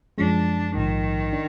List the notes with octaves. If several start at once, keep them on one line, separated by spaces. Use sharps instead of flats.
F#2 F3 G#3 D4
A#1 G#2 D#3 F3
D4